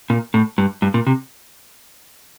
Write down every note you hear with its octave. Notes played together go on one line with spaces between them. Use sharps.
A#2
A2
G2
G2
A#2
C3